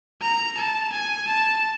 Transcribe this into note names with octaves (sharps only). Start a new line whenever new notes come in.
A#5
A5
G#5
A5